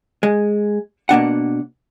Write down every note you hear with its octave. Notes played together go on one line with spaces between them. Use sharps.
G#3
B2 A#3 D4 F#5